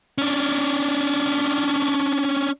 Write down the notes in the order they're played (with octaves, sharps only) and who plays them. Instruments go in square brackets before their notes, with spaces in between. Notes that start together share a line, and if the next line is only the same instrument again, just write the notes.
[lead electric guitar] C#4 D4